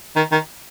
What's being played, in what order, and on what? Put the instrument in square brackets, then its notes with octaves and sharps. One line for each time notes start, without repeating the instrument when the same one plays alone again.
[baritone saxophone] D#3
D#3